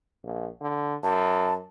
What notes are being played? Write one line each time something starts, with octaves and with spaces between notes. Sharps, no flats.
A#1
D3
F#2 A5